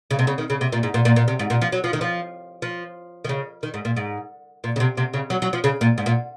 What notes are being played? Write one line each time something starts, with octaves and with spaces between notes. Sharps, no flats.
C#3
C3
C#3
D#3
C#3
C3
A#2
G#2
A#2
A#2
A#2
C3
G#2
A#2
F3
F#3
F3
D#3
F3
F3
D#3
C#3
D#3
G#2
A#2
G#2
A#2
C#3
C3
C3
C#3
F#3
F#3
F3
C#3
A#2
G#2
A#2